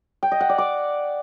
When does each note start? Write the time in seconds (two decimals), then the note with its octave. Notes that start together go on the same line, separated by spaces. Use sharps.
0.23 G5
0.31 D#5
0.40 F#5
0.49 D5
0.58 D6